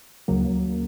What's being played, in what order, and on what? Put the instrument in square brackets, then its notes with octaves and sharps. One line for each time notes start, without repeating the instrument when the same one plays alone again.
[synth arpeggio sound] D2 C#3 F#3 A#3